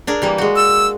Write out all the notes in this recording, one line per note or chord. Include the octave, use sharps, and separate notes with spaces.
D4 G#4 A#4
E3 G3 A#3
G#3 F#4
E6